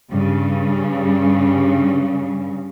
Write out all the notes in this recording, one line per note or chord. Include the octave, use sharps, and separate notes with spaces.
G2 C#3